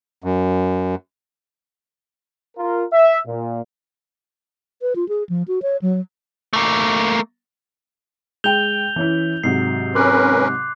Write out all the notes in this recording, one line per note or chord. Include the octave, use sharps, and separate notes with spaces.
F#2
F4 A#4
E5
A#2
B4
F4
G#4
F3
F#4
C#5
F#3
A3 A#3
G#3 G5 G6 F7 G7
E3 C#4 E4
G#2 C3 F#3 C7
C#4 A#4 B4 C6 D6 F#6